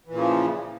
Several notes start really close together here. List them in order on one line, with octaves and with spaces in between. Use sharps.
E3 A#2 C#3 F3